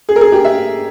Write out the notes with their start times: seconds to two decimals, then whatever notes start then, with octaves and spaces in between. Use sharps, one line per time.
0.09 G#4
0.16 A#4
0.21 G#4
0.32 G4
0.45 E5